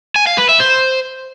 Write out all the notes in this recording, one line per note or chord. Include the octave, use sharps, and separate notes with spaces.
G#5
F5
B4
E5
C5